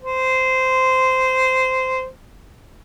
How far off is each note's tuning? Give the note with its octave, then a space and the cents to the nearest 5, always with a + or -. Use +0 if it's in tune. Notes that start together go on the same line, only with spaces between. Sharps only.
C5 -15